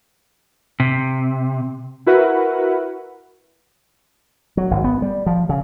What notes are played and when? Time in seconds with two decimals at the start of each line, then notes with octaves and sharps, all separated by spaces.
0.80 C3
2.06 E4 F#4 A#4 B4 E5 F#5
4.57 F#3
4.71 G#1
4.84 B3
5.02 G3
5.26 F3
5.49 C#3